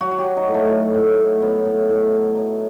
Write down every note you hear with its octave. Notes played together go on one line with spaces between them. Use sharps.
F#3 F#4
F#4
G4
F#3
D#4
A2
A3
F#3
A2
A2
F#3 B3
A2
A2
F#3
F#3